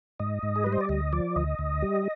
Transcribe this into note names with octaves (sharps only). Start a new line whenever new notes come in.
G#2 D#5
G#2
G#4
G3 B4
C5
D5
D2 D#5
F3 D5
D2 D#5
D2
G3